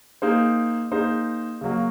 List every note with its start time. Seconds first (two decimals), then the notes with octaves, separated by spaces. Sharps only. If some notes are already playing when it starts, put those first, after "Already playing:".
0.22 A#3 D#4 G#4 C5
0.92 A#3 D#4 G#4 C5
1.61 C#3 F#3 A#3